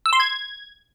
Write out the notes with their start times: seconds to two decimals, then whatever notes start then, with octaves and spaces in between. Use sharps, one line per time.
0.06 E6
0.13 C6
0.20 G#6